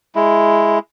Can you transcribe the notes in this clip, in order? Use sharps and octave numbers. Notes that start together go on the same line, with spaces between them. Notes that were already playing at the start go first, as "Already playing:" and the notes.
G#3 E4